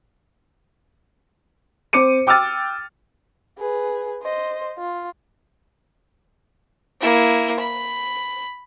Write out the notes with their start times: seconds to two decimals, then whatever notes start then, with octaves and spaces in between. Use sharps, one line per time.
1.93 C4 C5 D6 C#7 D#7
2.27 G5 D6 E6 F6 A6
3.58 G#4 B4
4.23 C5 D#5
4.78 F4
7.01 A#3 E4
7.60 B5